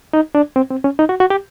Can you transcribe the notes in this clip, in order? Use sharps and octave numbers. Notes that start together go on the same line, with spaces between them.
D#4
D4
C4
C4
C#4
D#4
F#4
F#4
G4